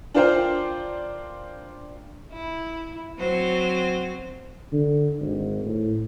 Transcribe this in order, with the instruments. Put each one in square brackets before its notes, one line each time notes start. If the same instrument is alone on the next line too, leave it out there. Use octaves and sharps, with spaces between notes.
[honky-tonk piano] D4 F4 A#4 C5 F5 G5
[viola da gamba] E4
F#3 C4 C5
[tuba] D3
G#1
A2